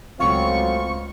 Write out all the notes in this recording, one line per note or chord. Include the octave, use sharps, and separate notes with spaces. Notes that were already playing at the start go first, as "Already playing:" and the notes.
C#2 F#3 A3 C4 F4 C#6